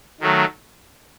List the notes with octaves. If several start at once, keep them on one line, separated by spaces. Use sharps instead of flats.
D#3 F#3 A3